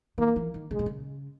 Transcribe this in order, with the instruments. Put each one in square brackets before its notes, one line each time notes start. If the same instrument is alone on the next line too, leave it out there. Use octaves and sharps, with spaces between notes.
[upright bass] D#3 [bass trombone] A#3
[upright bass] E3
D#3
[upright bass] C#3 [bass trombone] G#3
[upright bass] B2
C#3